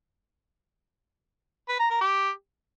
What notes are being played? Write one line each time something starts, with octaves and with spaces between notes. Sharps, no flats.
B4
A#5
A#4
G4